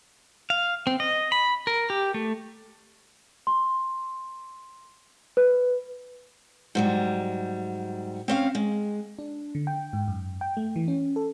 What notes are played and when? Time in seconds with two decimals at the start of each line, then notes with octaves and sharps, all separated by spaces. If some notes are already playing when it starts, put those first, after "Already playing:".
0.50 F5
0.87 C4
1.00 D#5
1.32 B5
1.67 A#4
1.90 G4
2.14 A3
3.47 C6
5.37 B4
6.75 G#2 F#3 G3
8.28 C4 C#4 F5
8.55 G#3
9.19 D4
9.55 D3
9.67 G5
9.93 G#2
10.08 F#2
10.41 G5
10.57 A3
10.76 E3
10.88 C#4
11.16 A4